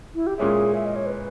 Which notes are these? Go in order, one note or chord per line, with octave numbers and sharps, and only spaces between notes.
E4
G4
A#2 G#3 C#4 E4 G#4
E5
D#5
C#5
B4